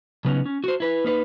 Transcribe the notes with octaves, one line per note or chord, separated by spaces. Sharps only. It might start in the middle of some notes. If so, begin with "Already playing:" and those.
C#3 F#3 B3 C#4 D#4
C#4
F#4 C5
E4 B4
A#3 D#4 B4